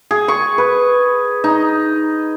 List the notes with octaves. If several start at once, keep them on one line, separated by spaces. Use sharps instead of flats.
G#4
C#6
B4
D#4